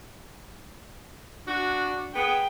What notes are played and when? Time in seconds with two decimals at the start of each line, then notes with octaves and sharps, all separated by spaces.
1.47 D4 F#4
2.15 B3 G#4 G5